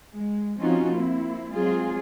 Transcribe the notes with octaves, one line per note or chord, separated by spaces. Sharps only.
G#3
F3 C4 C#4 D#4 F4 F#4
A#3 C4 E4
F#3 G#3 C4 F4 G#4